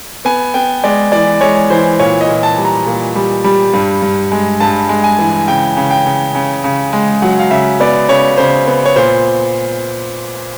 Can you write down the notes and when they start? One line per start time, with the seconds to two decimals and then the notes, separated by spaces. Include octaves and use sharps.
0.25 B3 G#5
0.54 B3 G5
0.84 G#3 D5
1.12 E3 D5
1.41 G#3 C#5
1.70 E3 C5
1.99 A#2 C#5
2.21 D#5
2.29 A#2
2.43 A5
2.58 G3
2.65 A#5
2.87 A#2
3.16 G3
3.44 G3
3.74 G2
4.02 G2
4.32 G#3
4.60 G2 A5
4.89 G#3
5.04 G#5
5.19 E3
5.48 C#3 G5
5.77 C#3
5.91 G5
6.06 C#3
6.35 C#3
6.64 C#3
6.93 G#3
7.22 F#3 F#5
7.39 F5
7.51 C#3 E5
7.80 B3 D5
8.09 C#3 C#5
8.38 C#3 C5
8.67 B3
8.86 C#5
8.96 A#2 C5